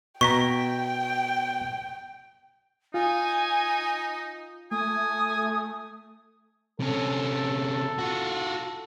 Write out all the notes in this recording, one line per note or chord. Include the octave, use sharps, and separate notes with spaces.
B2 G5 A#5 C#6 B6
D#4 F4 G#5
A3 G#5 D#6
C3 C#4 A4
F4 F#4